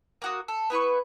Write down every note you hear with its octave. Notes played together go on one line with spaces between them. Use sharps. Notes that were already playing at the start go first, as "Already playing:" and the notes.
A#3 F#4 D#6
A4
B3 E4 B4 C#6